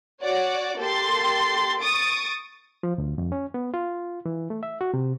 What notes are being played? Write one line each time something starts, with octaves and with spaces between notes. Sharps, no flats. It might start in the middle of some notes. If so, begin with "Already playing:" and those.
F#4 C#5 D5 F#5
A#3 G4 A4 C6 A6
C#6 D#6 A6 D7
F3
D2
F2
C#4
B3
F4
E3
A3
E5
F#4
C3